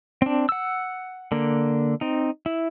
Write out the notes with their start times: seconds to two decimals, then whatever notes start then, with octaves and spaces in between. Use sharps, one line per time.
0.22 C4 D4
0.49 F#5 E6
1.32 D3 A#3
2.01 C4 D#4
2.46 E4